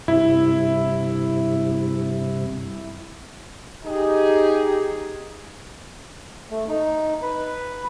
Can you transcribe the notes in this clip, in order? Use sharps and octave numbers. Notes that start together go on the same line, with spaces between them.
G2 C3 E4
D#4 G4 G#4
A3
D#4
B4